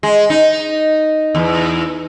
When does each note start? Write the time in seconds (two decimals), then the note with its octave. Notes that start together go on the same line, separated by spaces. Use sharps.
0.03 G#3
0.30 D#4
1.35 E2